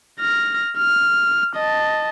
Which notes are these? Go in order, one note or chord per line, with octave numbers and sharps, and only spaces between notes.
F6 A#6
F6
D#5 A5